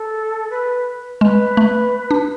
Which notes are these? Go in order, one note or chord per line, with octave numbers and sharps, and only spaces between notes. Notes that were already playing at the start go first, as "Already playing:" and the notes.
Already playing: A4
B4
G#3 B4
A3
D4